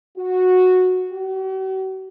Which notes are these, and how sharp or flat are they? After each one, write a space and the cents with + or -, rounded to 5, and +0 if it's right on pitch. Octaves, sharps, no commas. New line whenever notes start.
F#4 -10
F#4 +45